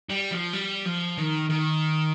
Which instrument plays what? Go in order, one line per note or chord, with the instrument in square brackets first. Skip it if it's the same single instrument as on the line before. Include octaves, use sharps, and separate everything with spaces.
[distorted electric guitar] G3
F3
G3
F3
D#3
D#3